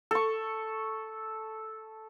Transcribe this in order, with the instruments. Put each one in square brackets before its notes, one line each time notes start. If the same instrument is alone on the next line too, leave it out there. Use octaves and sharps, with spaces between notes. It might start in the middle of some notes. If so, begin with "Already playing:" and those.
[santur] A4 C#6